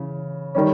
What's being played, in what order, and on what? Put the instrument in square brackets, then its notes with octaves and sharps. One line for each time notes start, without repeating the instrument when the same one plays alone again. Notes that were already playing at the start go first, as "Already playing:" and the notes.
Already playing: [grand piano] C#3 E3
D#3 G3 C#4